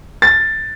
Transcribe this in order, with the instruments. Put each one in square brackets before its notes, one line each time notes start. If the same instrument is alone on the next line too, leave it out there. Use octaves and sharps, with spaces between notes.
[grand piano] A6